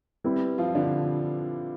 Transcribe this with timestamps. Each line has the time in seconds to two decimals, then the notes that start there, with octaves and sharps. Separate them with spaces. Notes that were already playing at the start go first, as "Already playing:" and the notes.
0.24 G3 C4 E4 B4
0.58 F3 F4
0.75 D3 D4